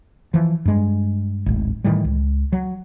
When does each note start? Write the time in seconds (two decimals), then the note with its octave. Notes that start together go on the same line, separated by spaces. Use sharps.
0.34 E3 F3
0.65 G2 G#3
1.46 D1 G#1
1.84 A2 D#3 E3 G3
2.05 C#2
2.53 F#3